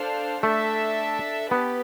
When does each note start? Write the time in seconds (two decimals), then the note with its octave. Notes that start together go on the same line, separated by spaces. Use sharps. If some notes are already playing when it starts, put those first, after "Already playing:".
Already playing: D4 A4 C5 F5
0.43 A3 D4 A4 E5 A5
1.50 B3 G4 B4